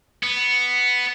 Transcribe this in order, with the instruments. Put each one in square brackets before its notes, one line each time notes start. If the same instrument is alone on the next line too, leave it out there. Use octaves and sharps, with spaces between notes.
[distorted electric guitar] B3